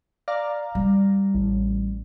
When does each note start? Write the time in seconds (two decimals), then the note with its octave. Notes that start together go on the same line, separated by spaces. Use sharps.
0.28 D5 F5 A#5
0.75 G3
1.35 A1